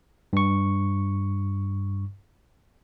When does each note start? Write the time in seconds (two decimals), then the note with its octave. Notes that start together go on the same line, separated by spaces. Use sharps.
0.33 G2 C#6